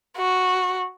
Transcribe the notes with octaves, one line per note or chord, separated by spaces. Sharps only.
F#4